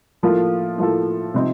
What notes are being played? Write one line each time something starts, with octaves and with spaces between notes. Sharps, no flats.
A2 F3 A#3 F4 A4
A2 F3 A#3 F4 A4
C3 F3 C4 D#4